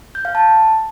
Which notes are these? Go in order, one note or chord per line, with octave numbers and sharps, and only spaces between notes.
G6
F5
A5